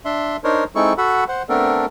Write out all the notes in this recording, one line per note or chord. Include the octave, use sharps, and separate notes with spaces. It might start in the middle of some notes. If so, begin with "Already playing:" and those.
D4 E5 C6
D4 D#4 A#4 C5 C#5
G#3 C4 D#4 E4 A4 C#6
F#4 A4 F#5 B5
C5 F#5
A3 B3 C4 D4 A4 A#4